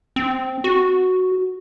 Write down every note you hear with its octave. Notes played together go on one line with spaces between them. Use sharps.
C4
F#4